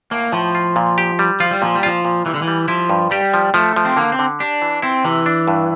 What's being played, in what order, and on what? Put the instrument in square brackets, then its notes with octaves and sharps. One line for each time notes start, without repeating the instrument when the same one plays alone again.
[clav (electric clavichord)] A2 [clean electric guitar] A#3
[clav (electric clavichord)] A2 [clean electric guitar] F3
[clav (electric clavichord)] F4
A#2
G4
G3
[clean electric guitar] F3 [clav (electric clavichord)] F4
[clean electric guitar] G3
[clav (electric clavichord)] A#2 [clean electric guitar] F3
[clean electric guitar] G3
[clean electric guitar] F3 [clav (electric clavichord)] F4
[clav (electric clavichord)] A#2
[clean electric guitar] E3 [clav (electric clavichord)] G3
[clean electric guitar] D3
E3
[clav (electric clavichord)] G3
[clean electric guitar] F3 [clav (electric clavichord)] E4
[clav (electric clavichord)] G2
[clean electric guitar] G3 [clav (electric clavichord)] G4
[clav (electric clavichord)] F3
[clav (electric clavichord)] F3 [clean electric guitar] A3
[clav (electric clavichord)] F3
[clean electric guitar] C4
[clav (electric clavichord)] D3 [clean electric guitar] A#3
[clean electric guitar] C4
[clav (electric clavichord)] D3
[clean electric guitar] D4 [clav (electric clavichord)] G4
[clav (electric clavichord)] E3
[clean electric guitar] C4 [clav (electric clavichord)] E4
[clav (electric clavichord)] C3 [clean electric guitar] E3
[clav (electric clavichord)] D4
G2